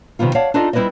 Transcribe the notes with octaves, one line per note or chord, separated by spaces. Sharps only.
C3 D#3 G3 B3 F4
C#5 D5 F5 F#5 A5
D4 D#4 F4 A4 D5 D#5
G3 C4 E4 B4 D5 D#5